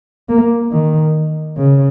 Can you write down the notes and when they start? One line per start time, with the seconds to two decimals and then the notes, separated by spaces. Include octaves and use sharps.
0.29 A#3
0.72 D#3
1.57 C#3